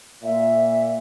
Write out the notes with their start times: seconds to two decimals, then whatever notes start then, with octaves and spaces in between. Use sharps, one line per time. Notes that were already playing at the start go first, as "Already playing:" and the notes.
0.23 A#2 E5